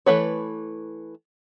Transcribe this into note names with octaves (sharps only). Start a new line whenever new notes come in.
E3 A3 B4 C#5